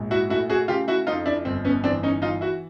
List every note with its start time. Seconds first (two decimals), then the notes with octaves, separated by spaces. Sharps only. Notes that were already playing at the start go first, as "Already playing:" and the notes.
Already playing: A#1 G#2
0.11 E4 F#4
0.29 A3 E4 F#4
0.49 F#4 G#4
0.68 C#3 F4 G4
0.88 E4 F#4
1.07 F2 D#4 F4
1.26 D4 E4
1.45 G1 C4
1.65 B3 C#4
1.84 E3 C4 D4
2.03 C#4 D#4
2.22 E3 D#4 F4
2.41 E4 F#4